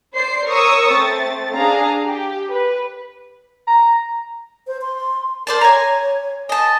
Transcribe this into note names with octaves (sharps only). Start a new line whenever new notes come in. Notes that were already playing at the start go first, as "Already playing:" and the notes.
C5 D5 C7
A#4 C#5 C#6 D#6 E6 C#7
A3 C4 A6
D4 G#4 F5 A#5
G4
B4
A#5
C5
C6
A#4 C5 D5 A5
C#5 G#5 A#5
D#5 G#5 A5